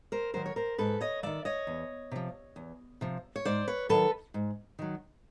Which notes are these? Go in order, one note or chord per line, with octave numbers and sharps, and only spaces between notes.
A#4 C5
D#3 F#3 A#4 C5
C#5
A#4 C5
G#2 A4 B4
C#5 D#5
D#3 F#3 D5 E5
C#5 D#5
E2
C3 F3
E2
C3 F3
C#5
G#2 C5 D5
B4 C#5
D#3 F#3 A4 B4
G#2
D#3 F#3